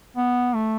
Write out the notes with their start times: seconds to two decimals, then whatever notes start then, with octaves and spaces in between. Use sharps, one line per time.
0.17 B3
0.55 A3